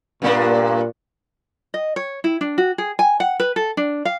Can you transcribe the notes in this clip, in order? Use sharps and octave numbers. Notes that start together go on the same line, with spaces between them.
G2 A#2 A#3 D4
D#5
C#5
E4
D4
F#4
G#4
G#5
F#5
B4
A4
D4
F5